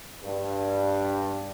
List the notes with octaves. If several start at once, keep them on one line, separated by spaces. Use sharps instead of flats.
G2